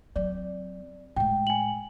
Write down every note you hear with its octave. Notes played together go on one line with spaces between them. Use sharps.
F#3 C4 D5
A2 G#3 G5
G#5 F#7